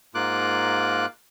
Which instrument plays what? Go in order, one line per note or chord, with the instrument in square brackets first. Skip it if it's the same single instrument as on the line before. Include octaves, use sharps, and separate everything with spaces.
[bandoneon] G#2 A#3 F4 D6 F#6